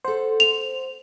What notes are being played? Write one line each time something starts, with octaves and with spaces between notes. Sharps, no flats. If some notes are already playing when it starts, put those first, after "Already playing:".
A4 C5 F#5
F7